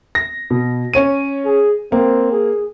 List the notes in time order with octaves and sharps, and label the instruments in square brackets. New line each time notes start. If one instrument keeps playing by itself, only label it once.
[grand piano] A#6
B2
C#4 C#5 D#7
[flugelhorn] G#4
[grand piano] A#3 [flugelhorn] C4
[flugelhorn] G#4